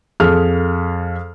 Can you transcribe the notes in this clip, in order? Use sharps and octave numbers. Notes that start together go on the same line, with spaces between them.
F2 G#4 A4 F6